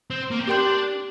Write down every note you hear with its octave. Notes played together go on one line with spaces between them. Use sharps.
C4
A#3
C4
D4 G4 A#4 G5 C6 G6